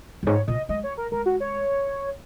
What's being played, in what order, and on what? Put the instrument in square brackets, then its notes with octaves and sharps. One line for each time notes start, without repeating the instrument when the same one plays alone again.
[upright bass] F#2
[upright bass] G#2 [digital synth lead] C#5
[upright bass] A#2 [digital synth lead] D#5
[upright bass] G#3 [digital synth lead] D#5
[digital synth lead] C#5
A#4
[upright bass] G#3 [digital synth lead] A#4
[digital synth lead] F#4
C#5